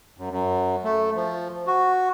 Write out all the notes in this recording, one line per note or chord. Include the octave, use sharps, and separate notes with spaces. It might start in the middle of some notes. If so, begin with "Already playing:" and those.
F#2
F#2
A3
F3
F#4